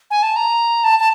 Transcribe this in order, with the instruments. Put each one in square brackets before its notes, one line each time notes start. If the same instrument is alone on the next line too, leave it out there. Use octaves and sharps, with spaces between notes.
[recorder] G#5
A5
A#5
A5
A5